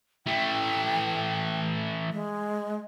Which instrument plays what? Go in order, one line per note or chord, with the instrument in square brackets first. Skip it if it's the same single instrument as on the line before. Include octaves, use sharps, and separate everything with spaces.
[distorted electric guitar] E3 A3 [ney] G5
[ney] G#3